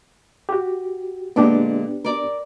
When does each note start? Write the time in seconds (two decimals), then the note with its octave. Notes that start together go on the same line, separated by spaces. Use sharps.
0.49 F#4 G4
1.36 A#2 D3 G#3 B3 D4 G4
2.04 A#4 D5